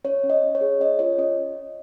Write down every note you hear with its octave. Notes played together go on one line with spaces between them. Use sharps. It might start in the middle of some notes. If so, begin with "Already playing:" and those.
C#4 C#5
C#4
D#5
C#4
C#5
G#4
C#4 D#5
F4 C#5
C#4 D#5